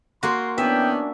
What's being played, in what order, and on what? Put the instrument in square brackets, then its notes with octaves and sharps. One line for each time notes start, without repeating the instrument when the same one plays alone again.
[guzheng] A#3 F#4 [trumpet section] C6
[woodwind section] E3 B3 [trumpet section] C#4 D4 [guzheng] E5 [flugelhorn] G5